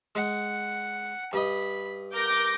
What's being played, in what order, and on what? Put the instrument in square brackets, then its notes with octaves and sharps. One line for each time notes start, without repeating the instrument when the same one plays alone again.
[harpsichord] G#3 [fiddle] F#5
[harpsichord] G2 D#5 [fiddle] B5
[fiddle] A#4 [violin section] D6 G6 A#6